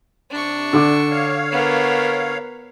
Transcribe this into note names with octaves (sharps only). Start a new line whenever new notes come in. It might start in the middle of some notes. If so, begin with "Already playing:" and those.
C3 D4 C#6
D3 D6
C#5 F5
B3 A#4